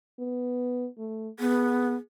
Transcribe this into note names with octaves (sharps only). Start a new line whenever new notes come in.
B3
A3
B3 G#4